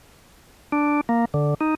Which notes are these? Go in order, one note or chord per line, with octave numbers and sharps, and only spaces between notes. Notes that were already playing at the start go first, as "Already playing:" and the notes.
D4
A#3
D3
D#4